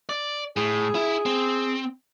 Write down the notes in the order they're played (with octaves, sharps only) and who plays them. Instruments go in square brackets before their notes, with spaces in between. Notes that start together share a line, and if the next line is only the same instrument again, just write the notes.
[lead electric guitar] D5
[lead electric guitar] A2 [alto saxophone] G#4
[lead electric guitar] E4
C4